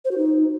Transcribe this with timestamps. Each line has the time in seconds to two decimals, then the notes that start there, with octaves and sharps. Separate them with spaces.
0.05 C5
0.11 F#4
0.18 D#4